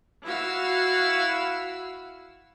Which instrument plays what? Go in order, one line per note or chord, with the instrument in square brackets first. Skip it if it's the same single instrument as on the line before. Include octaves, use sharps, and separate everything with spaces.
[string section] E4 F#4 F5 E6